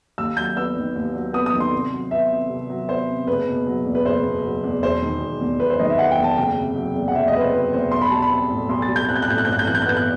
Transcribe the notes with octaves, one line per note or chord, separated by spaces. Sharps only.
D#2 E6
F#3 G6
B3 E6
D#3
D#2
F#3
B3 D#6
D#6
D#3
C6
C2
F#3
B3 E5
C3
C2
F#3
B3 C5
C3
F#1 B4
B2
F#3
E2
B4
F#1 C5
B2
F#3
E2
E1 C5
D#3
E1
E2
E1 B4
C5
D#3 D#5
E5
E1 F#5
G5
E2
A5
F#1 G5
C3
F#3
E2
F#5
F#1 E5
D#5
C3 B4
C5
F#3 B4
E2 C5
B1 C6
B5
G3 A5
B5
C4
A2
B1 C6
A6
G3
G6
C4 F#6
G6
F#6
A2 G6
F#6
G1 G6
F#6
G6
E3 F#6
G6
F#6
B3 G6
F#6